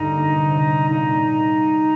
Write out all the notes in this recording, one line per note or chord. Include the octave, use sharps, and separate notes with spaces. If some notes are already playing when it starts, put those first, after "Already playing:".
Already playing: G2 D3 G3 D#4
A#3
C3
C3
G3
A#2 D#4
A#2